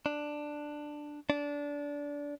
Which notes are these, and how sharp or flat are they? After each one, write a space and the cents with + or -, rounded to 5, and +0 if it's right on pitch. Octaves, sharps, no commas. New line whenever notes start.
D4 +10
D4 -20